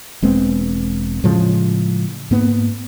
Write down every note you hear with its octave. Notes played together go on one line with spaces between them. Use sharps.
E1 G#3 B3 C4
A2 C#3 F3 G#3
G#2 A#3 B3